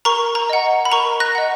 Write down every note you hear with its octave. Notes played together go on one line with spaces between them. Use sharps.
A#4 A#5 C#6
A#5
D#5 F#5
B5
A#4 A#5 C#6
F#6 A#6
D#5 F#5